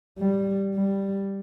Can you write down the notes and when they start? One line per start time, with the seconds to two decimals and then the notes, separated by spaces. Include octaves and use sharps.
0.19 G3
0.76 G3